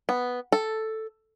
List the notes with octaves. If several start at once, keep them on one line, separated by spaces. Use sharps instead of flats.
B3
A4